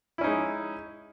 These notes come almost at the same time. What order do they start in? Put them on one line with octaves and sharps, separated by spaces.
E4 C#4 D#4 G#3